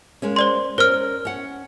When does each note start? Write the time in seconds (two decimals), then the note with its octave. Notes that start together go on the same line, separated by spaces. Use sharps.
0.22 G#3 A#3 C#4
0.36 C5 D5 C6
0.78 C#4 A#4 C5 F6
1.25 C#4 F#5